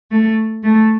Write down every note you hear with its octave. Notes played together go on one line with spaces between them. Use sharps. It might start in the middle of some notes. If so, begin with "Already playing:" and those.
A3
A3